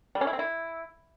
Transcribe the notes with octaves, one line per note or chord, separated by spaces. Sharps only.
G3
C#4
E4
C4
E4